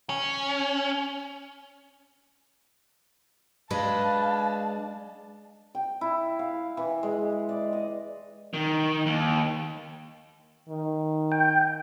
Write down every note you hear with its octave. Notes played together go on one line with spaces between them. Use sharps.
C#4
G#3 D4 B4 F5 A5
G5
E4
F5
E3
G#3
D5
D#5
D#3
D#2
D#3
G5